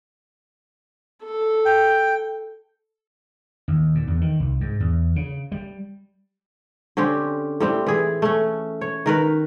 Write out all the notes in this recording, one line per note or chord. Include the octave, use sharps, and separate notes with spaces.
A4
G5
D#2
A#2
E2
D#3
C2
G#2
E2
C#3
G3
D3 C4 C#4 G4
A2 G3 C4
E3 G#4
A3 C#4
C#5
D#3 A#4 B4